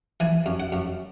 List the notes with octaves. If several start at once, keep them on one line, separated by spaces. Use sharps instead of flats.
E3 G#5
F#2
F#5
F#2